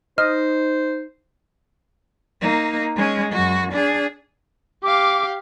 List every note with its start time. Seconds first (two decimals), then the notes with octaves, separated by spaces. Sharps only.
0.18 D#4 C5 D#5 F6
2.41 A#3 D#4
2.96 G#3 C#4
3.32 F#2 F#4
3.72 D4 G#4
4.83 G4 F5 D6